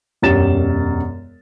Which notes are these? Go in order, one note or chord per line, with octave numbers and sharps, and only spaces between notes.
E1 F#2 G4 A6 E7